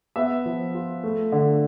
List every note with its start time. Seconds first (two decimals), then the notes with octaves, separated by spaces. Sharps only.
0.16 B3 E5
0.46 F3
0.74 F4
1.04 A3
1.32 D3